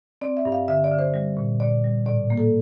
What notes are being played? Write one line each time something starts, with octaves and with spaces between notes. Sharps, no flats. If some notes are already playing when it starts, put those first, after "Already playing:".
C4 D5
E5
G2
F5
D3 E5
D5
D3
C5
G3
A#2
A#2 D5
G3
A2 D5
A#3
A4